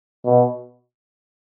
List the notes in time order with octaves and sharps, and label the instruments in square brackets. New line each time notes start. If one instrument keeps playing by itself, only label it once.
[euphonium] B2